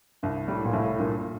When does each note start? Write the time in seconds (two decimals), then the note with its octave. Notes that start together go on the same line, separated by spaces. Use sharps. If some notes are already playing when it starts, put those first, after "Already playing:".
0.23 C2 G2
0.48 A2 G3
0.65 A#2
0.73 C2 A2
0.99 G2 A#2